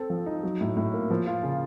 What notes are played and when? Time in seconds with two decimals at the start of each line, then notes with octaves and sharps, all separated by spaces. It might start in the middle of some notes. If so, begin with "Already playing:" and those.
Already playing: C4 A4
0.10 F3
0.26 D#4
0.43 F#3
0.61 A2
0.77 A2
0.94 A#3
1.11 F3
1.27 F4
1.43 C#3